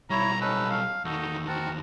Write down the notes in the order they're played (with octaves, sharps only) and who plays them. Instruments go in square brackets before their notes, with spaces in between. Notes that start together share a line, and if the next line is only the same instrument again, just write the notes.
[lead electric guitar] B1 G3 [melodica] E4 C#5 [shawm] A#5
[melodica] C#4 D#4 A4 [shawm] B4
[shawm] F5
[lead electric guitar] E2 D#3 [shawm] D#4 [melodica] F#4 A4
[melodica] C4 A#4 A5 [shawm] F#4